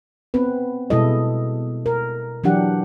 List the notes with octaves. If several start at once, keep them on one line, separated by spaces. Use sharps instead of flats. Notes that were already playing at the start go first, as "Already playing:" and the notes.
B3 C4 B4
B2 G3 G#3 E4 A4 D#5
A#4
E3 F#3 D4 G4 F#5